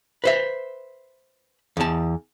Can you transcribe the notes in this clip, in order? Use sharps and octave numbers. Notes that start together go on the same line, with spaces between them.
B4 C5 E5
E2 A5